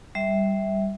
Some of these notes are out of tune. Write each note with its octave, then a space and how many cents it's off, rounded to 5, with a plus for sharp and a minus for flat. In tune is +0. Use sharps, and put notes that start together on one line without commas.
G3 +0 E5 -10